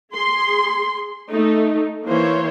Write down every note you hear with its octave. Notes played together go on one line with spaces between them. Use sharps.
G#4 C6
A3 D#4
E3 A#3 C5 C#5